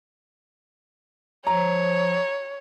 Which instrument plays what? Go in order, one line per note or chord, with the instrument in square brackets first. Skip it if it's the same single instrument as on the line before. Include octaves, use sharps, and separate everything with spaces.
[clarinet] F3 [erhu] C#5 [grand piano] A#5